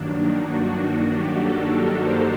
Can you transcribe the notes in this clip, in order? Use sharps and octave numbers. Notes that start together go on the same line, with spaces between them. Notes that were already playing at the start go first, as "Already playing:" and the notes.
Already playing: G2 D#3 F#3 A#3 D4
D#4
F#4
G4
A4
A#4
C5